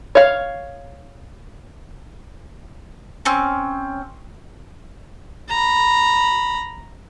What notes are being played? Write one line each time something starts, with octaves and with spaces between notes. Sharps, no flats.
C#5 F5
C4 C#4
A#5 B5